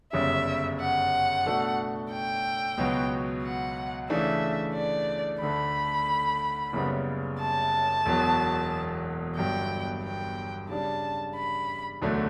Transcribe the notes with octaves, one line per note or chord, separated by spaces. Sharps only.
G1 F#2 C#3 G3 C#4 E5
F#5
B2 A3 D4 F#4 A4
G5
C#2 B2 F#3 B3 F#4
F#5
C#3 E3 A3 D4 E5
D5
D2 D3 A3 B5
F#1 F#2 C#3 G3 B3
A5
E1 E2 B2 F#3
G1 G2 F#3 G5
G5
C#3 G3 D4 A5
B5
E1 D2 D3 F#3 A3